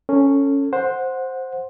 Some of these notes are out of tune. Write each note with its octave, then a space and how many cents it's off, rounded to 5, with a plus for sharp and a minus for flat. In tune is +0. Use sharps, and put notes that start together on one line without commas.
C#4 +0 A4 +20
C5 +5 F#5 -15